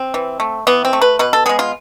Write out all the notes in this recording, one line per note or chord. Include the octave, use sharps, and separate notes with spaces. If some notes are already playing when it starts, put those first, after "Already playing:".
Already playing: C4
E3
A3
E3 B3
C4
A3
B4
B2 B4
A4
G#3 B3 G#4
F4